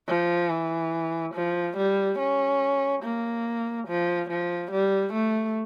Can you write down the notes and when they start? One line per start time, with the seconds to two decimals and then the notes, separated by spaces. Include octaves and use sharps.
0.08 F3
0.50 E3
1.34 F3
1.77 G3
2.19 C#4
3.03 A#3
3.88 F3
4.30 F3
4.71 G3
5.13 A3